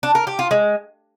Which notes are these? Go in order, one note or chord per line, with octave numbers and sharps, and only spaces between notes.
D4
A#4
G4
F4
G#3